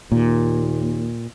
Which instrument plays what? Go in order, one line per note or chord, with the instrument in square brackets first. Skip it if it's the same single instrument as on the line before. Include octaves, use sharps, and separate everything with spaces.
[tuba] D#2 [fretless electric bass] A#2